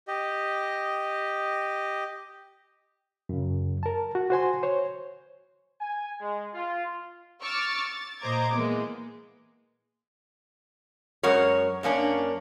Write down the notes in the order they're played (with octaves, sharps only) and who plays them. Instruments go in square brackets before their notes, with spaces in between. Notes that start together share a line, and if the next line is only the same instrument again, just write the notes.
[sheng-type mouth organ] G4 D#5
[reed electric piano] F#2 C#3
A#4 A5
F#4
F#4 C5 G#5 C6
C5 C#5
[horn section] G#5
G#3
F4
[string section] C#6 D6 E6 F6 A6
A6
A#2 C5 D#5 A#5 D6 G#6
E3 G#3 A#3 B3
[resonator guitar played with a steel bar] F#2 G#3 F#4 A#4 C#5
F#2 A#3 C#4 D4